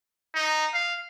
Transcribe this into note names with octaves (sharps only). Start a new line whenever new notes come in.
D#4
F5